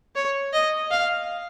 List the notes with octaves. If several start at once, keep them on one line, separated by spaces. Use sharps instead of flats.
C#5
D#5
F5